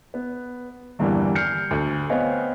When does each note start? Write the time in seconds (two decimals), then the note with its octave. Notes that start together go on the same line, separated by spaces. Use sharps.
0.14 B3
0.99 E2 G2 D3 E3 G3 A#3
1.35 F6 G6 C7 C#7
1.71 D2
2.10 B3 C4 C#5 D#5 F5 G#5